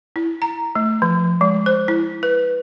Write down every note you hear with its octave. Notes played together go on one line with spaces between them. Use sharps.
E4
A#5
A3
F3
G#3
C5
E4
B4